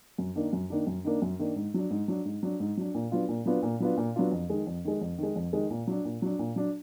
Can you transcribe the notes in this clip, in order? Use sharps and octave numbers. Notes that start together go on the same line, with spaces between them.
F#2
D#3 A#3 D4
F#2
D#3 A#3 D4
F#2
D#3 A#3 D4
F#2
D#3 A#3 D4
G#2
F#3 D4
G#2
F#3 D4
G#2
F#3 D4
G#2
F#3 D4
A#2
F#3 B3 D4 F4
A#2
F#3 B3 D4 F4
A#2
F#3 B3 D4 F4
A#2
F#3 B3 D4 F4
F2
D#3 G#3
F2
D#3 G#3
F2
D#3 G#3
F2
D#3 G#3
A#2
F#3 D4
A#2
F#3 D4
A#2
F#3 D4